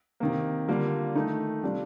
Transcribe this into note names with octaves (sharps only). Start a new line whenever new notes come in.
C3 D#3 A#3
D3 G3 A#3 F4
D#3 A3 D#4
C3 G3 D4 F4